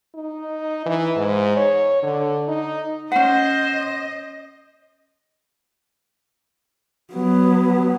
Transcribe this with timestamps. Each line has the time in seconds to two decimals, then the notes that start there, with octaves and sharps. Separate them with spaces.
0.15 D#4
0.86 E3
1.16 G#2
1.57 C#5
2.03 D3
2.48 D#4
3.12 C#4 C5 D#5 F#5
7.14 F#3 B3